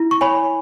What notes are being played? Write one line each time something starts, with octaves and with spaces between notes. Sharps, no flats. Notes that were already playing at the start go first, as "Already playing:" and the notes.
Already playing: E4
C#6
C#5 G#5 B5